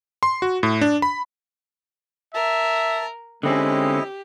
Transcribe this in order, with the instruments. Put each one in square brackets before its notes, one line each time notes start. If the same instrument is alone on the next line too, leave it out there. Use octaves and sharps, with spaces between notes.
[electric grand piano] C6
F#4
A2
D4
B5
[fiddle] A#4 [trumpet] E5 [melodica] A5
[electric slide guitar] D3 C4 C#4 [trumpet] G#3 [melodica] E4 D#5 [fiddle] G4